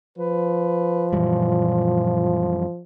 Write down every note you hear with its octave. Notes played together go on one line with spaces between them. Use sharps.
F3 B4
F#2 A#2 E3 G3